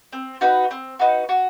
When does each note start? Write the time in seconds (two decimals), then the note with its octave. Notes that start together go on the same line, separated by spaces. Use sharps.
0.12 C4
0.41 D#4 F#4 B4
0.71 C4
0.99 D#4 F#4 B4
1.29 F#4